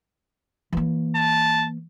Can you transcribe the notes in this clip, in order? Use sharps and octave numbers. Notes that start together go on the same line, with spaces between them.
E3 A#3
A5